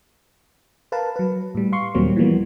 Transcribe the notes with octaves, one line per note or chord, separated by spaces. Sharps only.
A#4 B4 F5 A5
F#3 B4
A2 G3
F5 C6 C#6
D#2 A#2 F#3 G3 A#3 C4
E3 F3 G3 A#3 B3